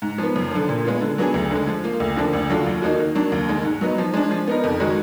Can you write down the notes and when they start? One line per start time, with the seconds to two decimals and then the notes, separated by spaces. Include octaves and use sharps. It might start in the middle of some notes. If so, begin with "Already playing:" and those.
0.02 G#2
0.18 F3 B3
0.36 F#2
0.51 D3 F3
0.69 A#2
0.85 G#3 B3 F4
1.01 D3
1.18 F#3 B3 D4 G#4
1.34 D2
1.51 D3 G#3
1.67 F3
1.84 A#3 F4
2.00 D2
2.16 D3 F3 A#3 D4
2.33 D2
2.50 D3 F#3 D4 F4
2.66 D#2
2.82 D#3 A#3 D#4 F#4
2.99 D#3
3.15 F#3 A#3 D4
3.32 D#2
3.48 D#3 G#3
3.65 G#2
3.81 F#3 B3 D#4
3.98 F3
4.14 G#3 D4
4.31 F3
4.48 B3 D#4 A#4
4.64 F2
4.80 D#3 G#3 D#4 F#4